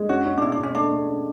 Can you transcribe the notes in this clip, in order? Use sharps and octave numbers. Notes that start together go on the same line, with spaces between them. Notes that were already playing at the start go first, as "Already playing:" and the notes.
Already playing: G#3
C#4 F#4
C#4
D4
B2 E4
D4
B2
C#4
A3 D4
A3
C#4